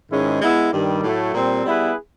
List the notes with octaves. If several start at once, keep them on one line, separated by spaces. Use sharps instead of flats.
G#2 D#3 G#3 C#4 E4
G#3 B3 E4
G2 D#3 G3
A2 F#3 A3
A#2 G3 C4
G3 B3 E4 G#4 B4